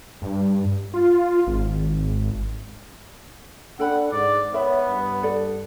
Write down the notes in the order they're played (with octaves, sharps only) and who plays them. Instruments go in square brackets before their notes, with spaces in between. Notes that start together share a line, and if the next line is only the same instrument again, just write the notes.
[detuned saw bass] G2
F4
G#1
[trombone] D4 [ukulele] A4 G5 B5 [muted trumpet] F#5
[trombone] G#2 [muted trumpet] D5
[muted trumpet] B3 [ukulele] A#4 E5 B5 [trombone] C#5
[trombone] G2
[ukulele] A4 D5